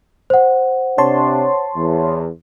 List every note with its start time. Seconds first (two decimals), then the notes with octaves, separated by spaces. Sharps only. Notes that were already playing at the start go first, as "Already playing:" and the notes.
0.30 C5 F#5
0.98 C3 D4 C#5 A5 C6
1.76 E2